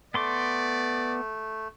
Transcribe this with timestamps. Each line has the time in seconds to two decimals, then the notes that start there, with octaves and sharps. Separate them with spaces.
0.14 A3 B3 D5 C6 D6